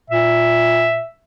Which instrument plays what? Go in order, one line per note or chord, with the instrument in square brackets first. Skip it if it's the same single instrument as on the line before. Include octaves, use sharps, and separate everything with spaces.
[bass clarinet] A#2 [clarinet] E5